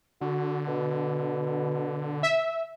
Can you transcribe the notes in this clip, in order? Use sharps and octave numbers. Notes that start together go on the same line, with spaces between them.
D3 F#4
B2
E5